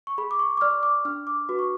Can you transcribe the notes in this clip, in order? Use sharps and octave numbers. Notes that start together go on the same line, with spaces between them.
C#6
G#4 B5
D6
C#6
D6
D5 F6
D6
D4 F6
D6
F#4 B4
C#6